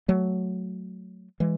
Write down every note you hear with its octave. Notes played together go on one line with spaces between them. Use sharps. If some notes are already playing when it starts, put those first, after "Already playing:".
F#3 A3
E3 G#3